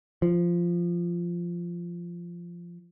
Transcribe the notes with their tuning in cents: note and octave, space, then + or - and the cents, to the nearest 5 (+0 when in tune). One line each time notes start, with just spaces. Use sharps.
F3 -10